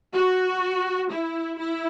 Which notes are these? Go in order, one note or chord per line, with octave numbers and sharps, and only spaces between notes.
F#4
E4
E4